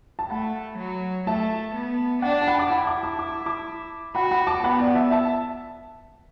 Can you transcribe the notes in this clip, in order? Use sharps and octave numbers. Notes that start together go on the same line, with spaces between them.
A5
A3 F#5 B5
F#3
A3 E5 A5
B3
D4 D5 F#5
A5
F#5 B5
A5 D6
E4 F#5 B5
A5 D6
A5 D6
D6
A5 D6
F#4 F#5 B5
F#5 B5
A5 D6
B3 F#5 B5
D5 F#5
E5 A5
E5 A5